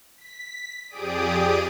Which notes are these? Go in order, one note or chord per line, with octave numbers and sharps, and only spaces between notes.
B6
F2 G4 G#4 D5 D#6 D7